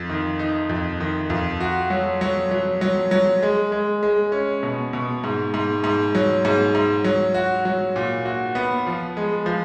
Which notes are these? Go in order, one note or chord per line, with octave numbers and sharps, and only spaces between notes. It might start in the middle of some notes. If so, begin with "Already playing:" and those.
Already playing: F2
D#3
D#4
F2
D#3
F2
F#4
F#3
F#3
F#3
F#3
F#3
G#3
G#3
G#3
C#4
B2
B2
G#2
G#2
G#2
F#3
G#2
G#2
F#3
F#4
F#3
A#2
F#4
B3
F3
G#3
F3